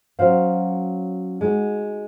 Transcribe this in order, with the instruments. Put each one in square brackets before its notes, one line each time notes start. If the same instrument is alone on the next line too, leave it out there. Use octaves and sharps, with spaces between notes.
[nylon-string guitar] F#3 C#4 F#4 C5 F5
G#3 D#4 F#4